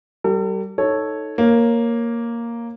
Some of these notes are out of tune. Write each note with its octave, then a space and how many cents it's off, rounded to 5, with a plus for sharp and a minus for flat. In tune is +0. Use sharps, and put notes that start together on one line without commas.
G3 -25 A4 +45
D#4 +0 A4 +0 C#5 -5
A#3 +0 C#5 -10